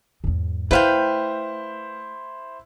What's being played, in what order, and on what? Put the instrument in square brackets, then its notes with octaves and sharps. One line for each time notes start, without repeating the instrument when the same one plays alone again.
[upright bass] E2 G#2
[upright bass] A3 [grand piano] E4 C5 [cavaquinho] B4 F5 G5